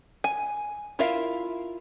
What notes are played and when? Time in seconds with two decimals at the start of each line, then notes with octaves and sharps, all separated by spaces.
0.24 G#5
0.99 E4 F4 A#4 E5 F5